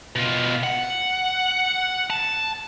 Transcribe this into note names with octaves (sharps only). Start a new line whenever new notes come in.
B2 F4
F#5
A5